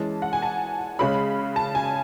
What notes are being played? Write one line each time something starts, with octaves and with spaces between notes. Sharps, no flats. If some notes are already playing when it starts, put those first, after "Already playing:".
Already playing: E3 G#3 C#4 A5
F#5
G#5
A5
C#3 G#3 C#4 B5
A5
G#5